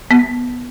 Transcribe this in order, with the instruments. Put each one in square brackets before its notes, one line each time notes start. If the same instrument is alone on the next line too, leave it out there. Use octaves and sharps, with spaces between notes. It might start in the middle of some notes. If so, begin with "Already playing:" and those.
[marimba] B3